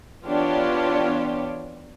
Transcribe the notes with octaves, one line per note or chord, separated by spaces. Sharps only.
E3 B3 D4 F4 G4 C#5